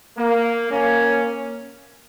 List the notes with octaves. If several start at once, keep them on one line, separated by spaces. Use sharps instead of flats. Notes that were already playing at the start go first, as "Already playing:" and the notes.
A#3
A#3 C#4